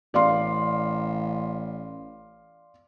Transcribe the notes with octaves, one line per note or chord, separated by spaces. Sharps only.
A1 D5 F5 C6